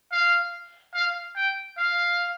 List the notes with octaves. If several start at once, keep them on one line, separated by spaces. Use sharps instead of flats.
F5
F5
G5
F5